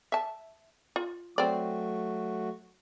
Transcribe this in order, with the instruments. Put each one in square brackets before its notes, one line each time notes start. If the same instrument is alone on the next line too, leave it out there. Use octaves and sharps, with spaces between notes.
[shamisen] E5 A5
F4
[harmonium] F#3 A3 F#4 [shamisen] C4 D5